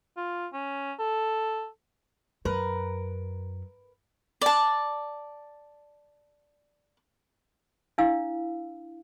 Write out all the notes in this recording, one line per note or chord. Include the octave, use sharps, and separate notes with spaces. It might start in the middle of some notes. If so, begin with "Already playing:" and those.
F4
C#4
A4
F#2 A#4 B4
D5 A5
D4 E4 F5 E6